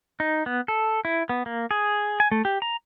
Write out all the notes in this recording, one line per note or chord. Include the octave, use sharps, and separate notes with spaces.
D#4
B3
A4
E4
B3
A#3
G#4
G#5
A3
G4
A#5